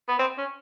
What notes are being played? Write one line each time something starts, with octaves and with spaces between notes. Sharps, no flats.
B3
C4
C#4